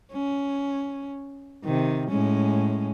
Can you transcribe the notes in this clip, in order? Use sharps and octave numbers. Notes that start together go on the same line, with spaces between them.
C#4
C3 D#3
A2 G#3 C#4